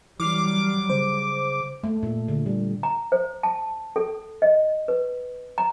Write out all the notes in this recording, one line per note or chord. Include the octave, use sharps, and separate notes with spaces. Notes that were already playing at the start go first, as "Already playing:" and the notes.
E3 F#3 G3 D6 F6 C7
C#3 C5
A3
A#2
D3
G3
A#5
C5
A5
A4
D#5
B4
A#5